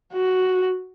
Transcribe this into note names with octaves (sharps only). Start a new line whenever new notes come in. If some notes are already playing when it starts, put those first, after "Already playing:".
F#4